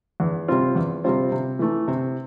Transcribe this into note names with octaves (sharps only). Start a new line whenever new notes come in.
E2
C3 G3 C4 F4
E2
C3 G3 C4 F4
C3
E3 A3
C3